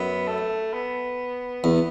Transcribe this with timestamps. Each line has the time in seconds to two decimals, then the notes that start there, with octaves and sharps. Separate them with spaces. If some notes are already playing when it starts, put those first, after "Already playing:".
Already playing: F#2 B3
0.28 A3
0.73 B3
1.64 E2